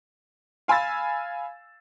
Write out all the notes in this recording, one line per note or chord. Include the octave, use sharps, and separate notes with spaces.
F5 G#5 B5 E6 A6